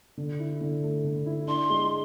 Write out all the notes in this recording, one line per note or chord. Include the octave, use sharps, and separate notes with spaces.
D3
E4
D3
A3
D3
E4
D4 C6
G#3